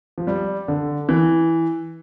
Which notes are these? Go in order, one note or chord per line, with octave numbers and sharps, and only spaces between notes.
F3
G3
D3
E3